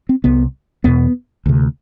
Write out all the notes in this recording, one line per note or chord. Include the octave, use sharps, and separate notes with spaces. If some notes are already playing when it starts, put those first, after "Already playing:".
C4
C2 C3 B3
E2 B2 B3
D2 C3